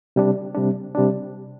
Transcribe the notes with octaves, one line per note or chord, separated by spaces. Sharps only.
C3 G3 D4
C3 G3 D4
C3 G3 D4